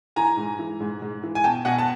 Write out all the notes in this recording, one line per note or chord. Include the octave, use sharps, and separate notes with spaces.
E3 G#5 A#5
G#2
E3
G#2
G#2
E3
G#5
B2 G5 A5
B2 F#5 G#5
A5